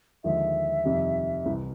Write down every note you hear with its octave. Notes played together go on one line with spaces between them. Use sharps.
D#2 D3 F3 G#3 E5
F2 C3 D#3 G3
C2 C3 E3